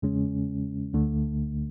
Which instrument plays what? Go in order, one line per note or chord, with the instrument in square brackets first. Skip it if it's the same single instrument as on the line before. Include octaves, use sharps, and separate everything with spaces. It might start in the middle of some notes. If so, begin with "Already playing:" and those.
[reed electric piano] E2 C#3 G#3 C#4
D2 D3 A3